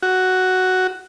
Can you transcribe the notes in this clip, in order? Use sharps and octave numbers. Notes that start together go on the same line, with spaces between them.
F#4